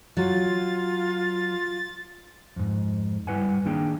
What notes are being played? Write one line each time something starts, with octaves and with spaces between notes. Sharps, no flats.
F#3 F4 A6
F2 G#2
G2 G3 E4 B4 F#5 G#5
D#3 A#3 D4 G#4 G5